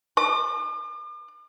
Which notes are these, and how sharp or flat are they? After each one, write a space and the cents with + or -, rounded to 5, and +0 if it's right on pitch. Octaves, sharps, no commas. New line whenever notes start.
D6 +45